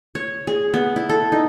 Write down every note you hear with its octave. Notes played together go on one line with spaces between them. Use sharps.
C#5
G#4
B3
E4
A4
D#4